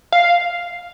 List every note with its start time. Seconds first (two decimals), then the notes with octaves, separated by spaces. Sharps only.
0.12 F5